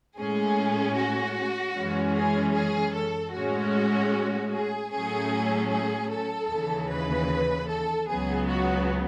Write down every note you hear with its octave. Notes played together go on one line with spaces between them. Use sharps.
A2 G#3 C#4 G#4
F#4
F#2 E3 G#3 C#4
G#4
G#4
A4
A2 G#3 C#4 F#4
G#4
A2 F#3 A3 C#4 G#4
G#4
A4
D#2 C#3 E3
B4
A4
C#2 C#3 F#3 B3 G#4
F#4